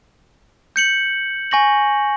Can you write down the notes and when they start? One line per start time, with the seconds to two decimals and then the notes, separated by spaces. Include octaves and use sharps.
0.76 G6 C#7 F#7
1.51 G#5 C#6 A#6 F#7